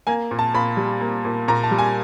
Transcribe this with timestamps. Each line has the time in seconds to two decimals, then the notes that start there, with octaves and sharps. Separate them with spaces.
0.07 A#3 G#5
0.31 A#2
0.39 A5
0.54 A#2 B5
0.77 G3
1.01 A#3
1.25 A#2
1.48 A#2 A#5
1.63 A5
1.71 G3
1.78 G#5